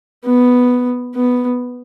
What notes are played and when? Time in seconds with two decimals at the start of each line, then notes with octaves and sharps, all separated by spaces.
0.25 B3
1.15 B3